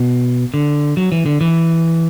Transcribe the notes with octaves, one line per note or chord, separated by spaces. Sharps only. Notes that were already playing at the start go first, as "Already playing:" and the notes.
Already playing: B2
D3
F#3
E3
D3
E3